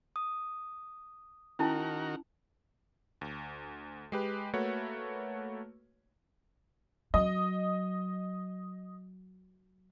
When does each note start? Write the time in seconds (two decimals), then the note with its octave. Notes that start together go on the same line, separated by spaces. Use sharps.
0.16 D#6
1.59 D#3 C#4 E4 F#4 A#4 A5
3.21 D2
4.12 G#3 G4 B4
4.54 A3 A#3 F#4 B4 C#5
7.14 F#3 D#5